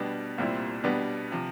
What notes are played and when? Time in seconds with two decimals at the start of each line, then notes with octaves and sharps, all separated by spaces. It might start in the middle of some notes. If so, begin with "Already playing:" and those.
Already playing: B2 G3 B3 D4
0.38 C2 A#2 G3 C4 E4
0.84 B2 G3 B3 D4
1.32 C3 F3